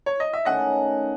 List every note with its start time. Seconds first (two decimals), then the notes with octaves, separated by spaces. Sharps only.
0.06 C#5
0.20 D#5
0.33 E5
0.45 D#3 A3 C#4 D#5 F#5